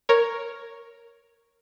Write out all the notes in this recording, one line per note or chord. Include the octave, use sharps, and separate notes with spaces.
A#4 C#5